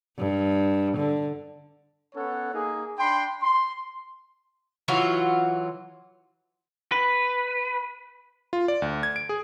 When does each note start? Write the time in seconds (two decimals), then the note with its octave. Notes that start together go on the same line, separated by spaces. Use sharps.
0.18 G2
0.97 D3
2.15 B3 C#4 A4 C#5 F#5
2.53 A#3 D#4 G#4
2.99 D4 G5 B5 C6
3.42 C6
4.88 E3 F#3 F4 F#4
6.92 B4
8.53 F4
8.68 D5
8.82 D2
9.03 G#6
9.16 D7
9.29 G#4